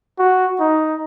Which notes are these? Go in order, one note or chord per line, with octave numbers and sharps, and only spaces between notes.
F#4
D#4